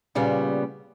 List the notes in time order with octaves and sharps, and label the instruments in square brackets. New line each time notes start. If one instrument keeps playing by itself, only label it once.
[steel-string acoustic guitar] A#2 C#3 G3 B3